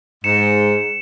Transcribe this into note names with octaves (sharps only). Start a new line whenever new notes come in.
G#2 C#7 E7